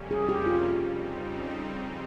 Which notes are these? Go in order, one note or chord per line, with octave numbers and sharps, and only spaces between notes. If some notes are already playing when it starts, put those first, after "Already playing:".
Already playing: F2 C3 G3 A#3 C#4
G#4
G4
F4
F2 C#3 G3 C4 D#4